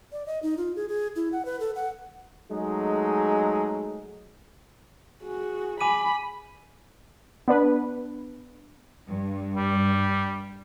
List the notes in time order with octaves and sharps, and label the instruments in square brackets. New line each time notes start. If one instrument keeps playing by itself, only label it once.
[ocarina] D5
D#5
D#4
F4
G#4
G#4
E4
F#5
B4
A4
F#5
[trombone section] F#3 G#3 A3 D#4 G#4
[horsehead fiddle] F#4 [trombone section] G#4
[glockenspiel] G#5 D6 D#7 [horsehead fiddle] B5
[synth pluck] B3 D4 B4
[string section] G2
[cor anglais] G3